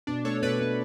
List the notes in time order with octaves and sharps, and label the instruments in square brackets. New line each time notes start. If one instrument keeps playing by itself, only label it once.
[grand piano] B2 [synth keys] D4
[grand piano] A3 [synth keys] A4 C#5
[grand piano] B2 [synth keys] B4 D5
[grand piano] A3